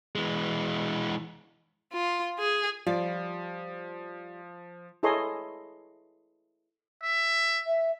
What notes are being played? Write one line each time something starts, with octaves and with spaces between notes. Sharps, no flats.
E3 G#3
F4
G#4
F3 G3 F4 D5
E4 G#4 A4 C#5 D#5 C6
E5
E5